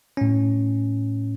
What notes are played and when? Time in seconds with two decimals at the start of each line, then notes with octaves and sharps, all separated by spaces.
0.17 A2 C#4